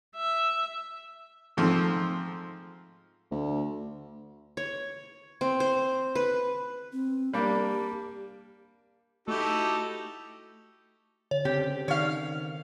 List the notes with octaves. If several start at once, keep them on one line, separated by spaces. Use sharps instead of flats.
E5
G#2 F3 A3 C4
D2
C#5
C4
C5
B4
C4
G3 A#3 D4 G4
A3 D#4 E4 F#4 G4 A4
D3 C#5
C#3 C4 G4
D#3 C#5 F5 C#6 F6